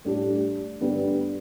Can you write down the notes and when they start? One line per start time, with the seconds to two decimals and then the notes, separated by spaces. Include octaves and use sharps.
0.05 A2 G3 D4 G4
0.81 G2 D3 G3 B3